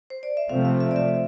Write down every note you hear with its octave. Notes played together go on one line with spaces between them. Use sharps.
C5
D5
E5
C3 F3 A3 C4 F5
E5
E5
D5
E5